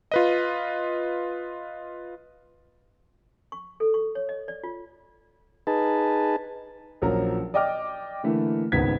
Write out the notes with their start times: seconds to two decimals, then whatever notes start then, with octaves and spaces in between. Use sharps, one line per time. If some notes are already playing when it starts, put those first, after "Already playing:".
0.12 F4 B4 D#5
3.52 C#6
3.80 A4
3.94 C#6
4.15 C#5
4.29 D#5
4.48 D5
4.64 F4
5.67 D#4 G#4 B4 A5
7.02 A#1 F3 F#3 C#4 A#4
7.54 D5 D#5 G5 D6 F6
8.23 D3 E3 A3 A#3
8.72 G#1 C#2 D#3 B3 G#6 B6